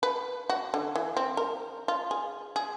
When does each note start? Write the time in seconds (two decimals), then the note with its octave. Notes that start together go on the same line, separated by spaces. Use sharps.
0.03 B4
0.50 F#4
0.74 D3
0.95 E3
1.17 C4
1.37 A#4
1.88 F4
2.11 G#4
2.56 G#4